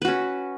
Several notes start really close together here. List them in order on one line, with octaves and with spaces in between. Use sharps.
B4 F#4 C#4